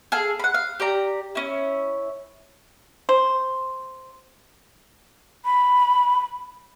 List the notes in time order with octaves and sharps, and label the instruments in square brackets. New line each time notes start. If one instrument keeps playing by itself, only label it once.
[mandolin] G#4 A4 F5
F#5 B5
F5
G4 D5 A#5
C#4 E4
[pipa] C5
[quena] B5